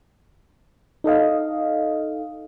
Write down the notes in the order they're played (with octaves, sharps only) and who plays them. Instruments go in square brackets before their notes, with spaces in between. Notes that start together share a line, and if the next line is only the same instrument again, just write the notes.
[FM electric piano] D#4 A4 D#5 F5